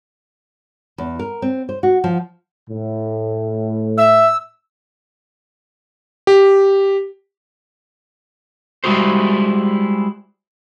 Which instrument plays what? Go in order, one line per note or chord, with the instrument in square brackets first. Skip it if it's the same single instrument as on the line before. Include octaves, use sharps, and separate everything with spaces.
[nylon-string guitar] E2
A#4
C4
C5
F#4
F3
[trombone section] A2
[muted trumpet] E5 [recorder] E6
[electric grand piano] G4
[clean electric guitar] G3 G#3 E4 F#4 G#4 C5